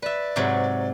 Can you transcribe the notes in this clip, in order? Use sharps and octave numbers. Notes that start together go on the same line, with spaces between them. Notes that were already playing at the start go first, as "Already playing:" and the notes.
B4 D5 E5
G#2 C3 F#3